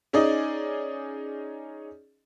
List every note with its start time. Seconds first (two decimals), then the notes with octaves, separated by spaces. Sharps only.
0.13 C#4 D#4 G#4 D5 D#5